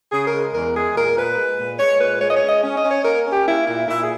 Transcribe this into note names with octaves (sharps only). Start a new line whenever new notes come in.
C#3 G#4
A#4
G#3
E2 A#4
G#3 G#4
A#2 A#4
A#2 B4
G#3
A#2
G#3 C#5
A#2 B4
G#3 C#5
D#5
C#5
C#4
D#5
C#4
D#5
C#4
C#5
A#3 A#4
C#4
G4
A#3 E4
A#2 E4
A#2 E4
G#4